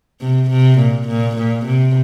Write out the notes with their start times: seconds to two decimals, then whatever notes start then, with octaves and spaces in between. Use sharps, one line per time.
0.21 C3
0.50 C3
0.79 A#2
1.08 A#2
1.37 A#2
1.66 C3